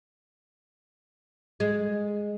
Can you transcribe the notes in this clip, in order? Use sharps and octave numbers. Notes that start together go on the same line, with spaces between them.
G#3